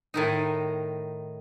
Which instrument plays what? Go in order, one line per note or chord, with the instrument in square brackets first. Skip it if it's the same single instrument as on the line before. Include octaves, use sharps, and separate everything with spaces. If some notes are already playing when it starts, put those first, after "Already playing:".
[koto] A2 D#3 D#4